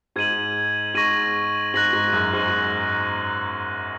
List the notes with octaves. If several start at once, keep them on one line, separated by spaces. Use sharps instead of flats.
G#2 G#6 D#7 F#7
G#2 C#6 A#6 D#7 F#7
G#2 F#6 A#6 F#7
G#2
F#2
G#2